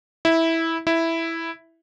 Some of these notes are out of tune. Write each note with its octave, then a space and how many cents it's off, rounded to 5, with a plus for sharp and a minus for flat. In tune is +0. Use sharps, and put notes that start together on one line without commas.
E4 -10
E4 +0